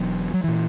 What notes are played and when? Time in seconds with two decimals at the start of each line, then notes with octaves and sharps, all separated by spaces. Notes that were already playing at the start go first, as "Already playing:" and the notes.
Already playing: E1 E2 B2 F#3
0.34 F#3
0.44 A#2 E3